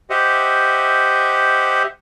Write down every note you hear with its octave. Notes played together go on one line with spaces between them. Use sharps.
G4 C5 D#5 E5 F#5